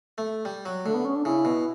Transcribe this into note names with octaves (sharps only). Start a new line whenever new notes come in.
A3
G3
F#3
D3 A3
B3
C#4
D4
C#3 E4
B2